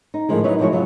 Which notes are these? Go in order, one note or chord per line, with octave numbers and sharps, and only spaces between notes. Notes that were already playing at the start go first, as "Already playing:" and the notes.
D#4
A2 D3 D#3 F3 G#3
F#3 D#4 E4 B4 C#5
E2 F3 G#3 E4 F#4 C#5
C#3 F#3 F4 E5